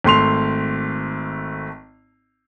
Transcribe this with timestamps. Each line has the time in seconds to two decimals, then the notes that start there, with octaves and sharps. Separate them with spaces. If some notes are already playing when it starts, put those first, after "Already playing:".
0.04 G#1 A3 C6 F7